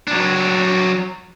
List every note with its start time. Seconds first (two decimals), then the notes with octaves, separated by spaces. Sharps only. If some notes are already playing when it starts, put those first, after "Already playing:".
0.08 F#3 D4